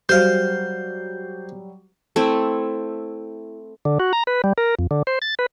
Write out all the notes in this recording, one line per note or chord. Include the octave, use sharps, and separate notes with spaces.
F#3 G3 C5 F5 G6
A3 C4 E4
D3
F#4
A#5
B4
G3
A#4
F2
D3
C5
A6
B4